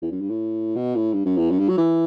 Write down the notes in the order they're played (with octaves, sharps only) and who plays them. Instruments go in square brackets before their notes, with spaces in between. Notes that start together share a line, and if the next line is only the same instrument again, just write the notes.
[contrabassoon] E2
F#2
G2
A2
B2
A2
G2
F#2
E2
F#2
G2
F#3
E3